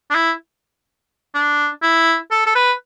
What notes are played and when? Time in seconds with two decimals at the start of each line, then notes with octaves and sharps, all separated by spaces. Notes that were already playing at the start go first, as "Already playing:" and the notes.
0.10 D4
0.14 E4
1.34 D4
1.82 E4
2.31 A4
2.46 A4
2.55 B4